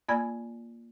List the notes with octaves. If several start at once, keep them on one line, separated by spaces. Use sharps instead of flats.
A#3 F4 D5 G#5 B5 G#6